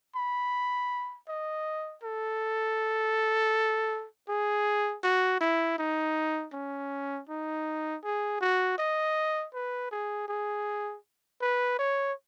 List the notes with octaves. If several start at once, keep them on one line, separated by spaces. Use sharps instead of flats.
B5
D#5
A4
G#4
F#4
E4
D#4
C#4
D#4
G#4
F#4
D#5
B4
G#4
G#4
B4
C#5